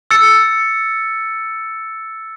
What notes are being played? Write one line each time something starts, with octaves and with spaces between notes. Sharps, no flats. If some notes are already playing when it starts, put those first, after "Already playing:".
E6 A6 C#7